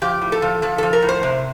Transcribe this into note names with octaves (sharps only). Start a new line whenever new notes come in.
F3 G4
A2
A4
F3
F3 A4
F3 A4
A#4
A2
C5
C3